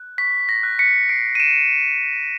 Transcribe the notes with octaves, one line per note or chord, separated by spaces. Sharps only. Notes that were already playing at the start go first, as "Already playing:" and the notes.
Already playing: F#6
C#6 B6
A#6
F#6
B6 C#7
F#6 C7 D7
D#7
D7 E7